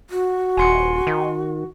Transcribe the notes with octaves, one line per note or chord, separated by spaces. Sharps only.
F#4
D#1 G#5 C6 C#7
D#3